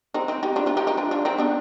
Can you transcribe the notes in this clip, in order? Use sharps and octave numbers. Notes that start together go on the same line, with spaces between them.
C4 D#4
C4 D#4
D#4 G4
D4 F4
D4 F4
D#4 G4
D#4 G4
D4 F4
D4 F4
C4 D#4
B3 D4